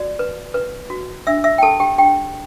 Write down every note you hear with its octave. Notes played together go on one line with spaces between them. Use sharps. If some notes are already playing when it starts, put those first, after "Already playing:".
Already playing: F#4 D5
B4
B4
F#4
D4 E5 E6
E5 E6
G5
G4 A4 A5
G4 G5
D4 G4 G5